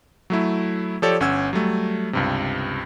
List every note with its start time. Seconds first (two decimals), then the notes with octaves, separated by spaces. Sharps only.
0.30 F#3 A3 E4
1.02 F3 G4 A4 C#5 D5
1.20 G1 C#4 F#5 E6 G#6
1.53 F#3 G3 A3
2.13 C#2 G2 C3